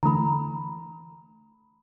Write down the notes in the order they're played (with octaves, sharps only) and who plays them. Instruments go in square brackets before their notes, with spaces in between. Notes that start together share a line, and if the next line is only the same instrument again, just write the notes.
[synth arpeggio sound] D3 E3 A3 [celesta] A#5 B5